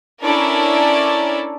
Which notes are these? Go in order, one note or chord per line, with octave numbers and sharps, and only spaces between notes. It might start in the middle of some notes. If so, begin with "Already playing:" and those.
C#4 D4 E4 A4 A#4 D5